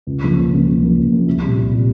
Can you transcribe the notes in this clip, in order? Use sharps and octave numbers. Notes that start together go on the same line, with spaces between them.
C#2
C#3 F3 A#3
C#2
C#3 F3 A#3
C#2
C#3 F3 A#3
C#2
C#3 F3 A#3
C2
A#2 G3
C2
A#2 G3